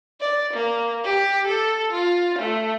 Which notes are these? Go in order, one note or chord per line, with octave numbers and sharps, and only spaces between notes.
D5
A#3
G4
A4
F4
A3